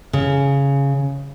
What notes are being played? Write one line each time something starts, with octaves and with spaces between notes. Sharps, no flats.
C#3